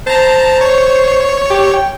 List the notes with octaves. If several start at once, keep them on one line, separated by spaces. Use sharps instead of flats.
C5 A5 A#5
C#5
G4
G5